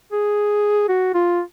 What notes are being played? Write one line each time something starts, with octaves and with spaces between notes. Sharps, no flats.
G#4
F#4
F4